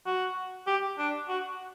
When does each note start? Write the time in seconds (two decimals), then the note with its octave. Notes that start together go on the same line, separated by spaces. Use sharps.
0.06 F#4
0.67 G4
0.98 D4
1.29 F#4